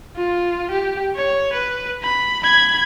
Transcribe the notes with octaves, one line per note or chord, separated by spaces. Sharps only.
F4
G4
C#5
B4
B5
B5 G#6